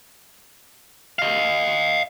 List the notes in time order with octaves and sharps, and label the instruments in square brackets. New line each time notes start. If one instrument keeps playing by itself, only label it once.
[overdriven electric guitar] D#5 F5